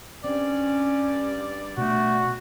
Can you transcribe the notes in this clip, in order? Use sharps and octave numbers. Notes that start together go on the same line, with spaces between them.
G2 C4 C#4 D5
B2 A3 D4 F#4